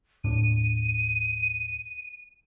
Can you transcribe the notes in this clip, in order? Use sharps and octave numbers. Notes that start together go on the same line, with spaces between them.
D#2 A2 D4 D#7